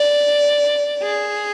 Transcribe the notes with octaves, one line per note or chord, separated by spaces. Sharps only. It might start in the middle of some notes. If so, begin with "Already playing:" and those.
Already playing: D5
G#4